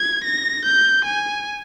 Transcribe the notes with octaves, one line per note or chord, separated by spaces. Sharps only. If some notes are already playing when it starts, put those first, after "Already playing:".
Already playing: G#6
A#6
G6
G#5